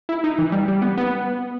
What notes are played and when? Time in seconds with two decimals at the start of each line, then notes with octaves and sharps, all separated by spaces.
0.09 E4
0.24 D#4
0.38 E3
0.52 G3
0.68 G3
0.82 B3
0.97 B3